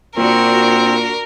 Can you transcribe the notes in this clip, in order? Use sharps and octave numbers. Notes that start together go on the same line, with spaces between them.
A#2 C4 D4 F#4 A#4